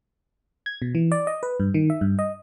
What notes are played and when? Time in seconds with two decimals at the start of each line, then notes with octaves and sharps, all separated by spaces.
0.66 G#6
0.82 B2
0.95 E3
1.12 D5
1.27 D#5
1.43 B4
1.60 G2
1.74 D#3
1.90 E5
2.01 G2
2.19 D#5